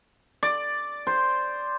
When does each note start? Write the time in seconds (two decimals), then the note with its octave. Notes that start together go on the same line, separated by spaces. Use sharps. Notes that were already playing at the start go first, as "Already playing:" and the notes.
0.43 D5
1.07 C5